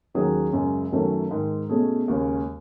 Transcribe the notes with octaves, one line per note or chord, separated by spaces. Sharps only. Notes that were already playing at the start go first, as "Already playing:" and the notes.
D#2 D#3 F#3 C#4 G#4
F#2 C#3 G#3
F#2 D#3 F#3 A3 C#4
G#2 D#3 G#3
B2 A3 C#4 G#4
D#2 C#3 G#3 C#4